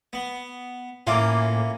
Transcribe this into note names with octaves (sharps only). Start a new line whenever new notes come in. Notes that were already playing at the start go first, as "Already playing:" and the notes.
B3
A2 E3 A#3 C#4 F4 F5 D6